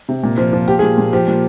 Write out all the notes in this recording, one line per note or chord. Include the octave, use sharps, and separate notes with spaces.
C3
A#2
F3
F3
F3 G4
G#4
A#2
A#2
F3 G4
A#2